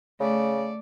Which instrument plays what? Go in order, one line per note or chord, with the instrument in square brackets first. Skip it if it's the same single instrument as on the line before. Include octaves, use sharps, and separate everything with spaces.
[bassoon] C#3 [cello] A3 D5